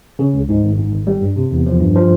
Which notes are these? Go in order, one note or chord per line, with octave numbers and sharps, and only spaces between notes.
C#3
C#2
G#2
G#1
G#2
G#1
G3
G2
C3
E2
F3
G2
F3